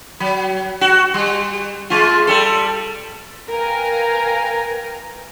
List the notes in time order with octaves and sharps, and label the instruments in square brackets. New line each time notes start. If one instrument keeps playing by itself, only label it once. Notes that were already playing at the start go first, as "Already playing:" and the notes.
[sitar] F#3
F#4
G3
G#3 F4
G3 A4
[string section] A#4 B4 F5 G5 G#5 A#5